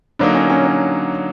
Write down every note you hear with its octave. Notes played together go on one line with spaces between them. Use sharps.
D3 F#3 A#3 D4 D#4
C#4
C#4
C#4